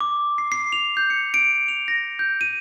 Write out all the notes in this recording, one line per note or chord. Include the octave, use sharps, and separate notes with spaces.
D6
C7
C7
F7
G6
C#7
D7
F7
A#6
G6
D#7